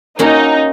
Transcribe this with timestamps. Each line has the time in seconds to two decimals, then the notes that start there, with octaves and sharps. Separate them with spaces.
0.19 A#3 C#4 D#4 F#4